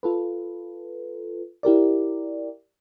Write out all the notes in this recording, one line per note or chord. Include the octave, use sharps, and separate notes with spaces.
F4 A4 B4
E4 G4 A#4 D5